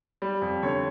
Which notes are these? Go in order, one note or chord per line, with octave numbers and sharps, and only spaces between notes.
G3
F2
D3 C#5